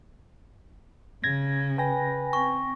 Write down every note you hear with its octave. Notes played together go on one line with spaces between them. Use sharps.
C#3 G#6 A#6
B4 G5 G#5 A#6
C4 C#6